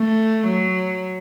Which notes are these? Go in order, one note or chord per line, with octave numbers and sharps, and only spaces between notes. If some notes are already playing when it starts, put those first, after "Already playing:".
Already playing: A3
F#3